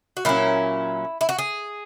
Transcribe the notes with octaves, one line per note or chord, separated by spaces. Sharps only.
F#4
A#2 F#3 C#4 E4
E4
F#4
G#4